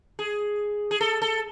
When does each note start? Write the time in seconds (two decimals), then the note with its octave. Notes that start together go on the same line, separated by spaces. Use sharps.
0.19 G#4
0.91 G#4
1.01 A4
1.22 A4